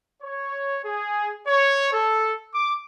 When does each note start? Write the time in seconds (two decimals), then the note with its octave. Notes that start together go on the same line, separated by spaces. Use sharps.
0.22 C#5
0.84 G#4
1.48 C#5
1.92 A4
2.53 D6